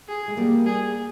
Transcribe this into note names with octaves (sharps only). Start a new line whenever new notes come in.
G#4
G#3
G3 A#3
G#4